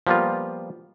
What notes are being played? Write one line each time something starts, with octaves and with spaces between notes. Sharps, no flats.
F3 G3 A#3 B3 F4